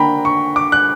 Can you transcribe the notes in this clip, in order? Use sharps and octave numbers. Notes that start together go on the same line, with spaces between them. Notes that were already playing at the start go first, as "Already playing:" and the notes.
Already playing: D3 A#3 D4 G5 A#5 B5
C#6
D6
F#6